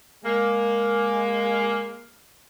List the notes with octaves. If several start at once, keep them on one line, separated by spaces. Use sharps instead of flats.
G#3 A#3